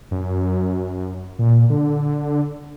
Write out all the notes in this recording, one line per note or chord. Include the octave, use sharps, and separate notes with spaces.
F#2
A#2
D3